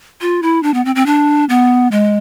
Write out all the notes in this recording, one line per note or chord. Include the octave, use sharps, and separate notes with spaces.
F4
E4
D4
B3
C4
C4
D4
B3
G#3